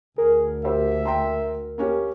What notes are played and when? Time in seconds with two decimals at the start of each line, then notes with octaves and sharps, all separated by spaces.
0.18 D2 G#4 A#4
0.65 G4 C5 E5
1.06 G5 A#5 C6
1.78 A#3 C#4 G4